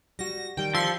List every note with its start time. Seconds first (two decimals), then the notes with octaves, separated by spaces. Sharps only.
0.19 G3 F#4 A#6
0.57 D#3 G3 G5
0.75 F3 C6 E6 B6 C#7